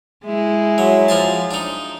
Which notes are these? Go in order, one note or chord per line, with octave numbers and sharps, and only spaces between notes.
G#3 E4
F#3
F3 G#5 A5
D4 D#4